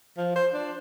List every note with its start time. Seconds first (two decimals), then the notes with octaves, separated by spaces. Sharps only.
0.17 F3
0.36 C5
0.53 D4